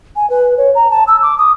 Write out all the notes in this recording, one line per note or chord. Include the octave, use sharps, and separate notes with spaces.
G#5
B4
C#5
A#5
A5
E6
D6
D#6